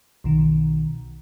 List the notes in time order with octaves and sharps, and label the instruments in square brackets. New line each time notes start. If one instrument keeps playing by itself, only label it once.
[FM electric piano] B1 B2 D#3